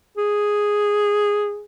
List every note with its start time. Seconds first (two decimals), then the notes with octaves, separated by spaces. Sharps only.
0.17 G#4